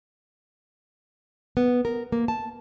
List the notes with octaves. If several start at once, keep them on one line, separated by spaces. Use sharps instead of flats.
B3
A#4
A#3
A5